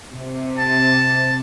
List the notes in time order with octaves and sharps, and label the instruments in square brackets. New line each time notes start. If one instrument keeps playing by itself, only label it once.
[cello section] C3
[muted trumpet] A5